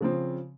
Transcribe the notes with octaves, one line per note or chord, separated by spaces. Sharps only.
C#3 F3 C4